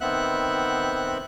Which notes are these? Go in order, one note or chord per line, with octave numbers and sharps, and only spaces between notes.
D#3 B3 C4 E5 F#5 F#6